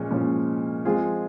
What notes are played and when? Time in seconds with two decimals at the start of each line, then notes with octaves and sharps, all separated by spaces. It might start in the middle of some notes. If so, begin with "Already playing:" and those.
Already playing: A#2 F3 G#3 C#4
0.10 A#2 F3 G#3 C#4
0.85 F3 G#3 C4 F4 G#4